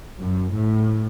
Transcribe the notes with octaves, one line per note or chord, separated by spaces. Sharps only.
F#2
A2